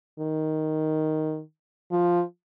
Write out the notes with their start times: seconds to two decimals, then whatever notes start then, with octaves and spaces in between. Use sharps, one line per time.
0.19 D#3
1.91 F3